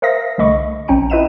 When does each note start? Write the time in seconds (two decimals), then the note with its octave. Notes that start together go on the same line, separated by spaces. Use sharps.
0.02 A#4 C5 E5 F5 D#6 A#6
0.38 C2 D3 A3 D#5 B5 C#6
0.88 A#1 C4 C#4 G5 A#5 C#7
1.10 E4 B4 D#5 E5 D#7 E7